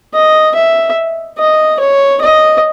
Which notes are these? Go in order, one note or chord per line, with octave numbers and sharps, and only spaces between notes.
D#5
E5
D#5
C#5
D#5